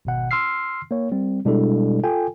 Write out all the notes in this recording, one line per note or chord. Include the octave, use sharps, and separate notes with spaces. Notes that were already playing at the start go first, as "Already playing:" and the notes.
G#1 B2 F#5
C6 E6 F6 C7
A#3 C#5
G3 C4
B2 G3 G#3 D4 E4 A4
F4 A4 G5 G#5